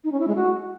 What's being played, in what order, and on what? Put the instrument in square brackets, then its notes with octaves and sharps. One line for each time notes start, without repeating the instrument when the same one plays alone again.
[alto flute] D#4
C#4
E4
G#3
F#4